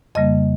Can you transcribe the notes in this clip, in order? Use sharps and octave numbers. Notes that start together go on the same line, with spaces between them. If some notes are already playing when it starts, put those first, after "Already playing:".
F2 C#3 G3 A#3 D#5